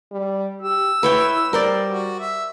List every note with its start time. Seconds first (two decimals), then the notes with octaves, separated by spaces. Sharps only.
0.12 G3
0.62 G4 E6
1.03 E4 B4 C#5 G5
1.53 G3 A#4 C5 D5
1.88 F#4
2.20 E5